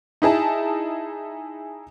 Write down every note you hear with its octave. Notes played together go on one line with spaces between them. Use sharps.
D#4 E4 G#4 A5